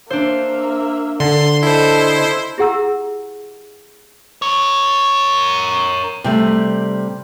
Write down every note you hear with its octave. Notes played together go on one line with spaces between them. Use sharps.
A#3 D4 C5 E5
D3 A5 C6
E4 A4 C5 D#5
E4 G4 G#4 F#5 A#5 E6
A#4 C#5
C3 G3 A3